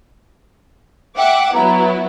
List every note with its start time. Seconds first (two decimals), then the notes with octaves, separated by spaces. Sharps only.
1.18 E5 F#5 G5 D6
1.54 F#3 B3 E4 A#5